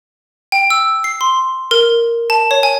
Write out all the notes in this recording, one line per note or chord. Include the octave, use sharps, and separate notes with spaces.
G5
E6
C7
C6
A#4
A5
C#5
G#5